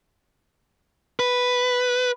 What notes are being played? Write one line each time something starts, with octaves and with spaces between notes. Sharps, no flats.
B4